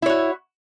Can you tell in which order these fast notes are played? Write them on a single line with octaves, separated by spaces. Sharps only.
E4 C#5 F#4